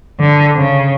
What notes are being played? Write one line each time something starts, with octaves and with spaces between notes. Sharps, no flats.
D3
C#3